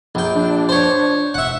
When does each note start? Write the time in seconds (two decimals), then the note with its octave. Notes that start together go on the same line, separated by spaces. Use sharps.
0.15 A#1 G5
0.35 D4
0.69 C5 C#5
1.34 E1 E5 F#5